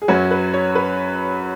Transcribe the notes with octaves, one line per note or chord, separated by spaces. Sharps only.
G#4
F#2 F#3 C#4 F#4 B4
B4
C#5
B4